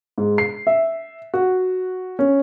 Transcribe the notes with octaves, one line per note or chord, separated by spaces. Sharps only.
G#2
C7
E5
F#4
C#4